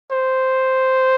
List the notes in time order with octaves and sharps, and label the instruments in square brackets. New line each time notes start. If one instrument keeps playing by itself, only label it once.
[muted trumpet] C5